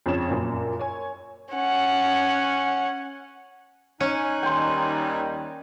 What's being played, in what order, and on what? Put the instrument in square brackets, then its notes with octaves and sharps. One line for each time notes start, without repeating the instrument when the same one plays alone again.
[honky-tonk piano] F2 C#3 C#5 E7
F#2 A#2
C#5 G#5
[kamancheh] C#4 F#5
[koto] C#4 [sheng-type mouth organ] D#4 G#5 F#6
[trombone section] D#2 D#3 G3 [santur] G5 C6